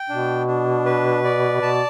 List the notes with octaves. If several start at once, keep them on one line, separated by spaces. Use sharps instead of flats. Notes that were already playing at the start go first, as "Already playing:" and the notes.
Already playing: G5
B2 D4
D4
B4
D5
B2 A5